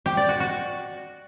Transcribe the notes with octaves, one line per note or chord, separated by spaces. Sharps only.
G4
D5
F#4
F#4